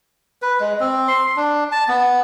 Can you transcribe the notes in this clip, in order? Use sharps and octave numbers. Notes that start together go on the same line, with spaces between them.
B4
G#3
C4
C6
D4
A5
B3